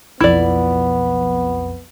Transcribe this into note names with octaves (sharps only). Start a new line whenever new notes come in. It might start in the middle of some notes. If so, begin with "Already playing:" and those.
B1 F2 B3 E4 D5